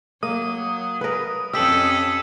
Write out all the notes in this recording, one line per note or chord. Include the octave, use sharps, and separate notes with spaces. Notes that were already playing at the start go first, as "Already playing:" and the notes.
F#3 A#3 D#6
A#4 B4
F2 C#4 G4 A4 E6 B6 F#7